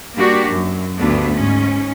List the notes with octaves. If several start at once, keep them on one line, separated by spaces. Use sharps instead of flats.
G3 A#3 D4 F#4 G4
F#2
D2 G2 A3 B3 D4
G#2 C#4